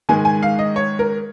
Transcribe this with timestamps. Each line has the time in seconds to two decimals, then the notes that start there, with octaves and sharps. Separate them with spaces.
0.09 G#2 D#3 G#3 G#5
0.25 G#5
0.43 F5
0.59 D#5
0.76 C#5
0.99 A#4